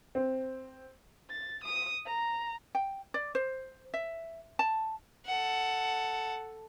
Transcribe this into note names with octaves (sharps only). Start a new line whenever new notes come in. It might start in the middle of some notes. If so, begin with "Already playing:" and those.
C4
A6
D#6
A#5
G5
D5
C5
E5
A5
A4 F#5